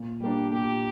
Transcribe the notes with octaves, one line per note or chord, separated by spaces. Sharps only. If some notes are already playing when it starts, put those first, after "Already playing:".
Already playing: A#2
G3 A#3 D4 G4
A#2 G4